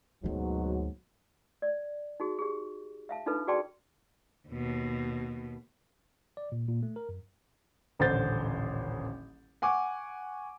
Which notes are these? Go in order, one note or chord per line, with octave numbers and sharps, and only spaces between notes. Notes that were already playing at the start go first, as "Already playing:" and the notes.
D2 G#2 B2 F#3 A#3
D5
D#4 F#4 G#4
G4 G#4
E5 F5 A5
D4 D#4 F4 A4 B4
F#4 G#4 D5 G5 A5 C6
D#2 B2
D5
A#2
A#2
A3
A#4
F#2
D#1 A1 D3 C5 G6 A6
F#5 G#5 C#6 D6